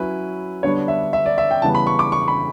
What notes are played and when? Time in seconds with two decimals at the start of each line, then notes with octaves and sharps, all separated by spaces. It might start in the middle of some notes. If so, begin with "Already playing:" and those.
Already playing: F#3 C#4 E4 B4
0.63 D3 G3 B3 D4 C#5
0.88 E5
1.13 E5
1.26 D5
1.38 E5
1.51 G5
1.62 C#3 E3 G3 B3 A5
1.75 B5
1.87 C#6
1.99 D6
2.12 C#6
2.28 B5